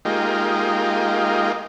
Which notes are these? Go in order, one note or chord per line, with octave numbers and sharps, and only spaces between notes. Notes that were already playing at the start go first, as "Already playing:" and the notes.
G#3 A#3 D#4 F4 G4